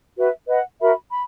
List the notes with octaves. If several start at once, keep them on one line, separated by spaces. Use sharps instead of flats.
F#4 B4 E5
B4 D#5 F#5
F#4 A#4 E5 B5
B5